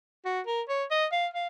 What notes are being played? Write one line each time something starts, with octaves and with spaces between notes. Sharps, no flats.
F#4
A#4
C#5
D#5
F5
F5